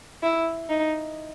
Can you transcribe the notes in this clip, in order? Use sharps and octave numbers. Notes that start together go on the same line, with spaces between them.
E4
D#4